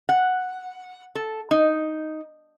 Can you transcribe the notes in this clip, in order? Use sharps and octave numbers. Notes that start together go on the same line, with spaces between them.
F#5
A4
D#4